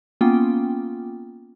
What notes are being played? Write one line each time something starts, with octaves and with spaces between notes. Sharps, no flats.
A#3 B3 C#4 F4 G5